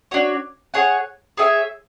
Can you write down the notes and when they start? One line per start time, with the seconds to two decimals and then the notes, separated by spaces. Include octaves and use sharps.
0.11 D4 F#4 C#5
0.74 G#4 C#5 F#5
1.37 G#4 C#5 E5 G#5